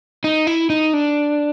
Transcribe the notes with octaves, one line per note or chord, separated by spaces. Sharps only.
D#4
E4
D#4
D4